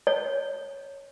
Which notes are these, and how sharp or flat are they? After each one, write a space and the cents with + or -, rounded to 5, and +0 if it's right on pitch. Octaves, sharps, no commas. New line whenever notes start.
C#5 -5